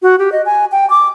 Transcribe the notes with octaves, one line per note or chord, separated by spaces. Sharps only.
F#4
G4
D#5
G#5
G5
D6